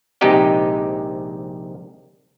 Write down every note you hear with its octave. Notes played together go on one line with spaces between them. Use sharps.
A#1 C3 G#3 D#4 G4 D#5